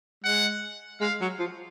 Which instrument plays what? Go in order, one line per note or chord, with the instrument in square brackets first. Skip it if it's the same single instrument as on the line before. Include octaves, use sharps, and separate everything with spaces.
[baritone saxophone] G#3 [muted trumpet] F#5
[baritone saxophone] G#3 [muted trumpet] F5
[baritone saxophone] F#3
F3